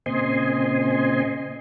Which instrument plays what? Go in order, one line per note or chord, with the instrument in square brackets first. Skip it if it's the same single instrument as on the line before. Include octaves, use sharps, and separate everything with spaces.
[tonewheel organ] A#2 C#3 C4 D#5 G#5 C6